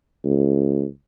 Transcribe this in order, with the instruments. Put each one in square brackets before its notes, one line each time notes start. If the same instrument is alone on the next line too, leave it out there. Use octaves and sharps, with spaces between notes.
[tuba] C#2